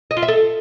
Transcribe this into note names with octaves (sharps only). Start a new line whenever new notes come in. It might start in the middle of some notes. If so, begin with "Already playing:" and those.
D#5
F4
E5
A4